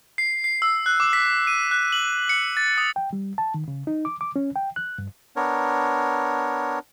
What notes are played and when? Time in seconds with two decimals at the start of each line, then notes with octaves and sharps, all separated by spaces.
0.18 C7
0.44 C7
0.62 E6
0.86 F#6
1.00 D6
1.13 B6
1.47 D#7
1.71 F#6
1.92 F#7
2.29 C#7
2.57 A6
2.78 D#6
2.96 G5
3.13 G3
3.38 A5
3.54 D#3
3.68 C#3
3.87 D#4
4.05 D6
4.21 D6
4.36 C#4
4.56 G5
4.76 F#6
4.98 G2
5.36 B3 D4 A#4 C#5